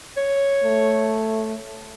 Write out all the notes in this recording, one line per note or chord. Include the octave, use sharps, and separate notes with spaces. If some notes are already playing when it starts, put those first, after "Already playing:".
C#5
A3